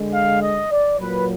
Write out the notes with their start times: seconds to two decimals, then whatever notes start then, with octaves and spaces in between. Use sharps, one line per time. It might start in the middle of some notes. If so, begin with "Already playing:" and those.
Already playing: D3 G#3
0.12 F5
0.42 D#5
0.72 D5
1.00 A#2 F#3 B4